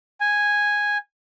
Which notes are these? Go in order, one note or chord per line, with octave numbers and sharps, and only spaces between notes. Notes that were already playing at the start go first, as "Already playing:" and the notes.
G#5